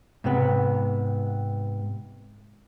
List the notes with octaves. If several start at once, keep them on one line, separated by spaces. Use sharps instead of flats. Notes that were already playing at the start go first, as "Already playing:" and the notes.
G#2 C3 B3